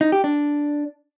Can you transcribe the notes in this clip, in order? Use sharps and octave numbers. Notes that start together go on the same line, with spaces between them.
D#4
G4
D4